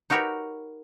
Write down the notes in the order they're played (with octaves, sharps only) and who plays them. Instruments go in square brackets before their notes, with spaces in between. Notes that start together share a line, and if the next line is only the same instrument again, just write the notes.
[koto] D#4 F#4 G4 A#4 B4 C#5